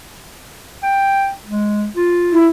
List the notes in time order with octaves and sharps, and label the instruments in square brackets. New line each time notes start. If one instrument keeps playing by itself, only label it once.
[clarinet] G5
G#3
F4
[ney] E4